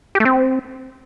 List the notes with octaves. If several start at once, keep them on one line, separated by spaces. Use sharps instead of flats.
G4
A3
C4